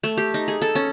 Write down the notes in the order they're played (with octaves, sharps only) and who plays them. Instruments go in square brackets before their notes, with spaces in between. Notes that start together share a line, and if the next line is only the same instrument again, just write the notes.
[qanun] A3
G4
D#4
G#4
A4
C#4